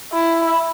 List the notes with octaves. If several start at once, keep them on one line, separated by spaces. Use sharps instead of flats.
E4